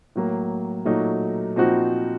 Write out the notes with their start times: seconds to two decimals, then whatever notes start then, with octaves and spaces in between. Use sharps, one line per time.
0.15 A2 F#3 A#3
0.85 A#2 F#3 A3 D#4 F#4
1.56 A#2 F3 C4 D#4 F#4